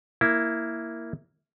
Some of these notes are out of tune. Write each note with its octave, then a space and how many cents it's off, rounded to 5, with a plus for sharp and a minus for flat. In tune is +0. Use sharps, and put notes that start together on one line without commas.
A#3 -5 E4 +0